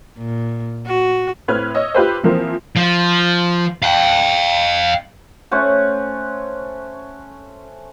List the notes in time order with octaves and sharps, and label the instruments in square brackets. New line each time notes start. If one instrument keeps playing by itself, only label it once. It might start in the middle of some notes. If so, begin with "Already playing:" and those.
[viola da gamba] A#2
F#4
[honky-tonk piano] A2 C4 B4 F6 G#6
C#5 D#5 E6
F4 G4 B4 C5
E3 F3 A#3 C4
[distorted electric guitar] F3
F5 G5
[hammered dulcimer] A3 C#4 C5 F#5